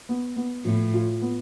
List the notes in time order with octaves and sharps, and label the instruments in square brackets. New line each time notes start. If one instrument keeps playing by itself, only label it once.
[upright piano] B3
B3
[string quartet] A2 [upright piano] F3
[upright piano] F4
B3